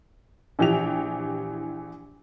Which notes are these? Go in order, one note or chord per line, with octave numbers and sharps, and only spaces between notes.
A#1 E3 G4 F7